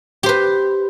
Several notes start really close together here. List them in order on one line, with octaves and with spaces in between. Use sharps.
G4 C5 B4